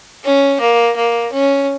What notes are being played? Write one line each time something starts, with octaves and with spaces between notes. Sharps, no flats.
C#4
A#3
A#3
C#4